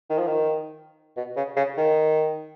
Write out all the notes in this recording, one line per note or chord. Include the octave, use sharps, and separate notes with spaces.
D#3
F3
D#3
B2
C#3
C#3
D#3